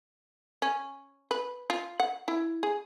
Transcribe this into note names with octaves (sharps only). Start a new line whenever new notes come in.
C#4
B4
F4
F#5
E4
G#4